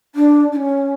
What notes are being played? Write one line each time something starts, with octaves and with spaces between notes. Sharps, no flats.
D4
D4
C#4